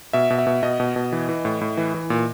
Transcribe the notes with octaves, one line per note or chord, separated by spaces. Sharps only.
B2 E5
B2
E5
B2
B2 D#5
B2
B2
E3
E3
A2
A2
E3
E3
A#2